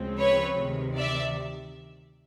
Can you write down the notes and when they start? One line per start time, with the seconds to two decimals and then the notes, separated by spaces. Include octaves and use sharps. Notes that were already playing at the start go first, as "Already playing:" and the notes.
Already playing: D2 C#3 F3 G#3 C4
0.20 B4 C#5
0.58 D2 C3 D#3
0.97 D5 E5